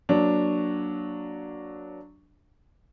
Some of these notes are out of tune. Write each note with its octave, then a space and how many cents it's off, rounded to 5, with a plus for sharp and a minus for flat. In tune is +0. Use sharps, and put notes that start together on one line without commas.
F#3 +0 A#3 +20 D4 +0